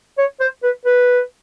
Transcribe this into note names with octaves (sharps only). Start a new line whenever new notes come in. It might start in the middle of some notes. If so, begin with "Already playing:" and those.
C#5
C5
B4
B4